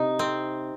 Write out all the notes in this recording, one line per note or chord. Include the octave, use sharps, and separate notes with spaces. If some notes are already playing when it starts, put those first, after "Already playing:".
Already playing: C3 D#4
C4